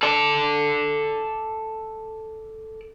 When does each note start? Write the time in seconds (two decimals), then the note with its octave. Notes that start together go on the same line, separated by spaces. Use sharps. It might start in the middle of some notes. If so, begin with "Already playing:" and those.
0.03 A4 D5